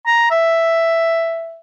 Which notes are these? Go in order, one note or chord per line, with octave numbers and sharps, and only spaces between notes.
A#5
E5